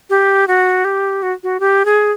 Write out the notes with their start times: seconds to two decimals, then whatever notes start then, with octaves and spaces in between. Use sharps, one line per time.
0.10 G4
0.48 F#4
0.85 G4
1.22 F#4
1.43 F#4
1.60 G4
1.85 G#4